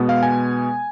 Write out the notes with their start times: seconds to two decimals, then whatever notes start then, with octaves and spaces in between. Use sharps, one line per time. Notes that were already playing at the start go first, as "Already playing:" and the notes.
Already playing: B2 G#3 B3
0.09 F5
0.23 G#5